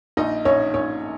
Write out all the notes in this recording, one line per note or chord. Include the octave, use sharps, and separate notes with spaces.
A#1 D#4 D#5
A#1 C#4 C#5
A#1 C#4 C#5